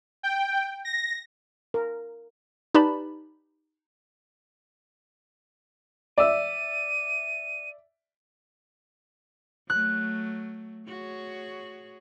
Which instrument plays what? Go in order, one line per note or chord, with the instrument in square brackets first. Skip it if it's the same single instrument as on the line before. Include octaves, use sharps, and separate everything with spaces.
[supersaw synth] G5
A#6
[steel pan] A#4
[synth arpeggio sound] D#4 G4 B4 D5 A5 B5
[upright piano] D5 E5 E6 [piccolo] D#7
[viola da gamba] F#3 A3 [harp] F#6
[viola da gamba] F#4 G#4 C#5